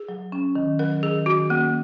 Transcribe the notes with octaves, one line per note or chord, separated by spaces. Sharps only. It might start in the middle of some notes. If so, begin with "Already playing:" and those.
Already playing: G#4
F#3
C#4
D#3
F#3 A#4
D#3 G#4
D#3 F#4
A#3 C#4